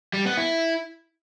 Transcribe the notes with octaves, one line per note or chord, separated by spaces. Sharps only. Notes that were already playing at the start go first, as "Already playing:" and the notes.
G3
B3
E4